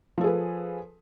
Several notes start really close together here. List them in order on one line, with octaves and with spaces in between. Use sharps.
F3 A4 G#4 B4